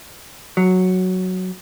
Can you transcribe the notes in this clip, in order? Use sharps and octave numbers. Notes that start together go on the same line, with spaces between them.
F#3